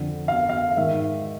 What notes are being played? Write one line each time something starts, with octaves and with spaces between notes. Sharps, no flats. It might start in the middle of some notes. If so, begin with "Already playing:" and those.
Already playing: F2 D3
F5
F5
G#2 D#3 E5